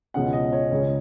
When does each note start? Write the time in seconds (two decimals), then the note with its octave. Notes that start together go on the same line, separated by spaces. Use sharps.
0.14 C#2 B2 G#3 C#4 F#5
0.33 D#5
0.53 C#5
0.71 C#2 C#3 G#3 C#4